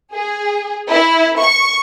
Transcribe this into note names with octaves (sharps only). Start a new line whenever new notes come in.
G#4
E4
C#6